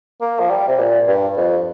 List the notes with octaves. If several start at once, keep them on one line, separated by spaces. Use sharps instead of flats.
A#3
F3
G3
C3
A#2
G2
F2